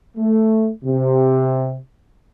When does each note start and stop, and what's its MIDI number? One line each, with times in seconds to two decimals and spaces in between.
0.17 0.69 57
0.85 1.77 48